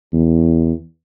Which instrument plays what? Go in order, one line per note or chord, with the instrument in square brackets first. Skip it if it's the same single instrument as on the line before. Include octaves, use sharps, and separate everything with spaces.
[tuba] E2